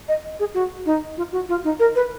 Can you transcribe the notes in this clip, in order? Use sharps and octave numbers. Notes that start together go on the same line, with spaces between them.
D#5
G#4
F#4
D#4
F4
F#4
F4
D#4
A#4
B4